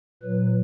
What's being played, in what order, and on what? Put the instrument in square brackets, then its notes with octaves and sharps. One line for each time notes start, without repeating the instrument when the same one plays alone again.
[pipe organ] A#2 F#3 B4